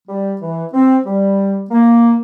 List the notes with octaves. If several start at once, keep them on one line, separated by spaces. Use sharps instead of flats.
G3
E3
C4
G3
A#3